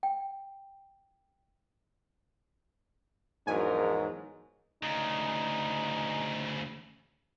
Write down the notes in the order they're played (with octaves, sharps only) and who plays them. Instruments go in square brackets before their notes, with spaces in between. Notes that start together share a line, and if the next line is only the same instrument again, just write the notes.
[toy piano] G5
[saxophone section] E2 F#3 [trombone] G#2 [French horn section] F3 D4 A#4 [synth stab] G#5
[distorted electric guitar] D2 C#3 [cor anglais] D#4